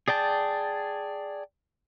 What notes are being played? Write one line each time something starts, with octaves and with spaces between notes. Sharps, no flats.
G#4 D5 G5 A5